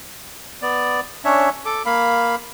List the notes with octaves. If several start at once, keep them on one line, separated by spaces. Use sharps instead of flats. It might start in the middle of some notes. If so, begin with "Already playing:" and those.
B3 D5
C#4 D4 C#5 E5
A4 D6
A#3 F5 B5